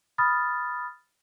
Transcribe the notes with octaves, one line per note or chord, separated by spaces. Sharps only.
B5 D#6 F6 A6